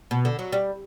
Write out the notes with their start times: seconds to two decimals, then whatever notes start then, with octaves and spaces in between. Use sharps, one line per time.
0.11 B2
0.25 D3
0.39 F#3
0.52 G3